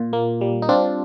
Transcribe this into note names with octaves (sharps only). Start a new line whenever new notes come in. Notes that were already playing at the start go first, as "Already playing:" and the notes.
Already playing: A#2 F4
A#3
G3
D#4
C4 D4 F4